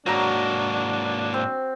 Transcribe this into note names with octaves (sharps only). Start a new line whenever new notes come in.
G#2 F#3 A#3 D4 F#4 A#5
C4